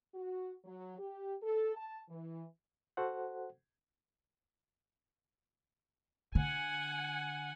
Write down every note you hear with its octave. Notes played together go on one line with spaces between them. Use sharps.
F#4
F#3
G4
A4
A5
E3
F#4 A4 C5 F#5
D3 F#5 G#5